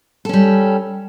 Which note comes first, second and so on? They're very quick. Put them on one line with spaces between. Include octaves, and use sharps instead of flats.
A4 C#4 G3